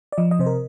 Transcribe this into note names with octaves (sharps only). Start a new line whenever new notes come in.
D5
F3 D#5
D#5
C3 C5
A#4